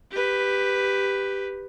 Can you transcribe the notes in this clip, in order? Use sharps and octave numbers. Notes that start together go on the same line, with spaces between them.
G4 B4